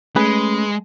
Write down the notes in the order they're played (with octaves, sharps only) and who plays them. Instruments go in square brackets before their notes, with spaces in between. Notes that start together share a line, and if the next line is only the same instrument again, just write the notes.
[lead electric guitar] G#3 [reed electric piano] A3 C#4 [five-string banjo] G#4 B4